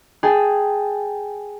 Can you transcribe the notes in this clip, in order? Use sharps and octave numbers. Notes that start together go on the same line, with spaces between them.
G#4 G5 A5